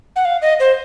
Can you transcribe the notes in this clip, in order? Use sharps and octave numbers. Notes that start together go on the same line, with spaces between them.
F#5
F5
D#5
C5